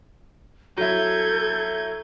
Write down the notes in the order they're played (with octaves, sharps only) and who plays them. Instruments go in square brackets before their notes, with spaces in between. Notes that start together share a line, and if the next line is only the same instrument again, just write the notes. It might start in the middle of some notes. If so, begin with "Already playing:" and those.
[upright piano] F#3 E4 [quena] A4 [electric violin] G6 G#6